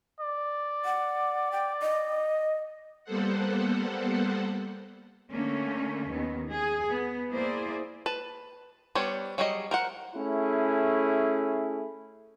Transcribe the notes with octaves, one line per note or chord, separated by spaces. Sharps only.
D5
F#5
G5
D#5
G3 A#3 B3 A4 C5 F#5
D3 A3 A#3 C#4
D#2 D#3 B3
G#4
B3
A#3 E4 G#4 C5 D5
B4 A5
G3 B3 D4 C5 C#5
F#3 G3 G#4 C#5 D#5
A#4 C5 F#5
A3 C#4 E4 G#4